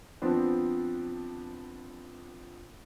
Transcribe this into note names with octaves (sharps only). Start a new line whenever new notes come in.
F3 B3 C4 D4